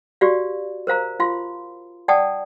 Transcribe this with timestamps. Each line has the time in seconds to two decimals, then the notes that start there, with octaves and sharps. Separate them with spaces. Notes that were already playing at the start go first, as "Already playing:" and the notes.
0.21 F#4 G4 D5 F5
0.87 A#4 C5 F5 A#5
1.20 F4 F5 C6
2.08 D5 F#5 G5 A5 D#6